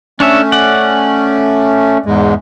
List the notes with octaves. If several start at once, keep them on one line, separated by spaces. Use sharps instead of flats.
A3 C#4 D4 C#5 E5
D5 F#5
E2 G#2 G#3